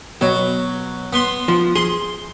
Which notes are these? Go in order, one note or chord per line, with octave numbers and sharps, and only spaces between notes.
B2 F#3
B3 C6
F3
G#4 C6